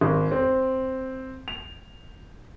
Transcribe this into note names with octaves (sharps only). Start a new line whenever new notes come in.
G#1
C4
F7